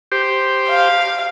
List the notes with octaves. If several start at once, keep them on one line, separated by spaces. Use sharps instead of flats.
G4 C5
F5